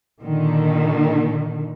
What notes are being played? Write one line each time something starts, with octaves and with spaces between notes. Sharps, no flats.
A#2 D3 D#3